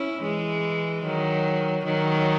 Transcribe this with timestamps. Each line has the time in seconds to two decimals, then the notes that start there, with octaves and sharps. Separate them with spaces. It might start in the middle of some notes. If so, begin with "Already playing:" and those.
Already playing: C#4 E4
0.21 E3 G#3
1.02 D#3 F#3
1.85 D#3 F#3